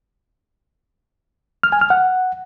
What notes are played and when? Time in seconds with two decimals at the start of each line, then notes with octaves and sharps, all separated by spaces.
1.63 F6
1.72 G#5
1.81 F6
1.90 F#5